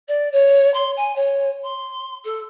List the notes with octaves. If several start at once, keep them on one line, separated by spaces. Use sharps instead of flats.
D5
C#5
C6
G#5
C#5
C6
A4